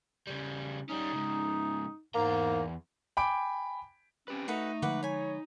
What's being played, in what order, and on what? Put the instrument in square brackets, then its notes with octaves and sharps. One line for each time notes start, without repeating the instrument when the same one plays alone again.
[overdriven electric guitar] C#3 G3
[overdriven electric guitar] G3 C#4 [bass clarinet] D#4
[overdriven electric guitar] G#2 C#3
[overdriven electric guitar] E2 A#5 [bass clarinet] G#2 [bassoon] A#3
[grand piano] G5 G#5 B5 D6 D7
[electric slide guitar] C4 G4 B4 [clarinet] C#4
[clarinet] A3 [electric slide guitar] D#4 [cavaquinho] F#4 A4 B4
[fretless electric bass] D3 F3 G#3 [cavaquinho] B4 F#5 D6
[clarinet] C#5 [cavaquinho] G#5 B5